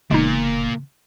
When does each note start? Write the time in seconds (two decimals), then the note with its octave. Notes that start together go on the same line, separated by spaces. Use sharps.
0.11 F1 A#2 C#3 E3 G#3 B3 D#4